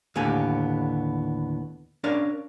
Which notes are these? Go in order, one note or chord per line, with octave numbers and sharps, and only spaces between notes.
D#2 A2 D3 B3 G4 G#5
C#4 D4 A#4 C#5 D5 F5